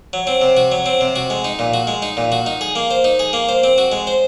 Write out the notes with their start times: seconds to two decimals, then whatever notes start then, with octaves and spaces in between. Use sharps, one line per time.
0.13 F#3
0.27 C4
0.42 C3
0.57 F#4
0.72 F#3
0.86 C4
1.01 C3
1.16 F#4
1.30 G#3
1.44 D#4
1.59 A#2
1.74 F#4
1.87 G#3
2.02 D#4
2.17 A#2
2.32 F#4
2.46 D#4
2.61 G#4
2.76 A#3
2.91 C5
3.04 D#4
3.19 G#4
3.33 A#3
3.49 C5
3.64 C4
3.78 F#4
3.92 G#3
4.07 C5